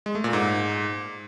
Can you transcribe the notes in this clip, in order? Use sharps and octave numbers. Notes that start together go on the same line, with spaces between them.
G#3
A3
A#2
G#2